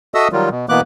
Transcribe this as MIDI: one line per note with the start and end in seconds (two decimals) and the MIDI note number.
0.14 0.28 66
0.14 0.28 69
0.14 0.28 75
0.14 0.28 76
0.14 0.28 87
0.14 0.28 88
0.32 0.49 51
0.32 0.49 54
0.32 0.49 55
0.32 0.49 65
0.51 0.66 47
0.69 0.81 47
0.69 0.81 52
0.69 0.81 58
0.69 0.81 59
0.69 0.81 86
0.69 0.81 90